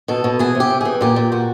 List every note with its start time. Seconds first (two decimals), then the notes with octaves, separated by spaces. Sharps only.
0.08 B2 A4
0.24 B2
0.39 E3 G#4
0.55 C3
0.60 G4
0.70 C3
0.81 E3 G#4
1.01 A#2 G4
1.16 A#2
1.32 A#2 F#4